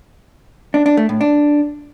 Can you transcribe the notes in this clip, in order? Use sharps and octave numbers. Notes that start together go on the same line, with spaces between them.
D4
D4
A3
A2
D4